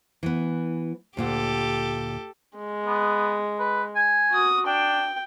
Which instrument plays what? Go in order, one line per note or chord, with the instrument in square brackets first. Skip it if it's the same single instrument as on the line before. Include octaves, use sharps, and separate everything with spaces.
[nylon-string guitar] E3 B3
[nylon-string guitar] D2 A#2 F#5 [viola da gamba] G4 A4
[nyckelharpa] G#3
[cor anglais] B3
B4
G#5
[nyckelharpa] F#4 D#6
[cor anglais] D4 [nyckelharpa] G5